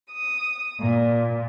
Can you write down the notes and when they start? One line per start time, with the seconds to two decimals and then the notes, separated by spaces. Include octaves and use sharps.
0.11 D#6
0.80 A#2